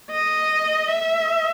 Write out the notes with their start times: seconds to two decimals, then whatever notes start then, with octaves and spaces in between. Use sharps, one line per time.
0.11 D#5
0.88 E5